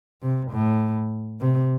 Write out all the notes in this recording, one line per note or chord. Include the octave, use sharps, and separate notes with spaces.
C3
A2
C3